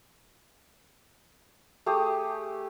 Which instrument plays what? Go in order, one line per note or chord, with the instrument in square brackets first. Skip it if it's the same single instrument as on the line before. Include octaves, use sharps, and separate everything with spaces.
[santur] A3 G4 G#4 D#6